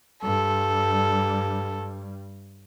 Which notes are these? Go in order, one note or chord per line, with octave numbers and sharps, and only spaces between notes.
G2 G3 A4